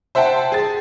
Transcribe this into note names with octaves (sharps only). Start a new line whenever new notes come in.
C5 E5 F#5 G5 A5
G#4 A6